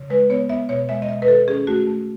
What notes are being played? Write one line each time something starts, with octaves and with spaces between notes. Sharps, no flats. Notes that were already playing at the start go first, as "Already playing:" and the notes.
Already playing: C#3
G#3 B4
B3 C#5
B3 E5
B2 C#5
G#3 E5
D#5
B2 E5
B4
D#3 A4
C#4 G#4
A3 F#4
A3